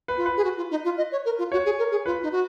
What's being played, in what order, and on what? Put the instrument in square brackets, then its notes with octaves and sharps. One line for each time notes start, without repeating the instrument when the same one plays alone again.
[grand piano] B4
[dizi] F4
[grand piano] B4
[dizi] G#4
F#4
F4
D#4
F4
D#5
C#5
A#4
F4
[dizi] F#4 [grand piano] C#5
[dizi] G#4
A#4
G#4
[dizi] F4 [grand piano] B4
[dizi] D#4
F#4